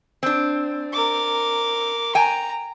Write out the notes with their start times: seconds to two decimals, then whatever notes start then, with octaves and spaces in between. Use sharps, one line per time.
0.23 C4 D4
0.93 A#4 D6
2.15 G5 G#5 A#5